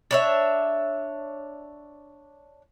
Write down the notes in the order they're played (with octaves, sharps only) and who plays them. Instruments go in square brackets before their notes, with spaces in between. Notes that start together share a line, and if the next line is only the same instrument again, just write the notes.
[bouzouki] D4 C#5 E5